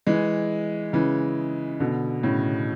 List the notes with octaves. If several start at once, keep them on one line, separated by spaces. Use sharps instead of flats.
E3 G#3
C#3 E3
B2 D3
A2 C#3